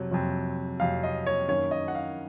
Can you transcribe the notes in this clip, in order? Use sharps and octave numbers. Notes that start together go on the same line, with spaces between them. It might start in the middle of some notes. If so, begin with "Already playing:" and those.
Already playing: F2 C3 F#3
F2 C3 F#3
F2 C3 F#3 F5
D#5
C#5
F#2 D#3 A#3 C#4 C#5
D#5
F#5
F5